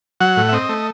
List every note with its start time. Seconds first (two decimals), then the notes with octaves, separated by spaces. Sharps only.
0.20 F#3 F#5
0.37 A2
0.49 E5
0.53 C4 D#5
0.69 A3